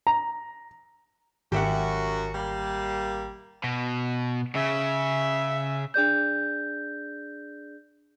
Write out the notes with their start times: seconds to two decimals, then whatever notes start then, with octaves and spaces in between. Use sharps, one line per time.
0.07 A#5
1.52 G#1 F#2 F#4 G4 E5 F#5
2.34 G3 A#3
3.64 B2
4.55 C#3 E5
5.94 D4 G#4 D5 G6